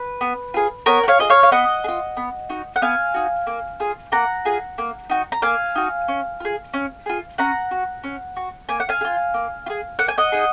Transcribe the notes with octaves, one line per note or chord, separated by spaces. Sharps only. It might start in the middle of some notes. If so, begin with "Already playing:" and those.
Already playing: B4
B3
F4 G#4
B3 A#4 C#5
F#5
C#5 F5
F4 G#4 D#5
C#5 F5
F5
B3 D#5 F#5
G#4
F4
B3
D#4 F#4
F#5
B3 F5 G#5
D#4 F#4
A#3
F4 G#4
A#3 F#5 A#5
F4 G#4
A#3
D#4 F#4
A#5
A#3 F5 G#5
D#4 F#4
C#4
F4 G#4
C#4
F4 G#4
C#4 F#5 A#5
F#4
C#4
F#4
A#3 G#5
F#5
F5 G#5
G#4
F4
A#3
F4
G#4
A#3 F#5
G#5
D#5 F#5
D#4 G#4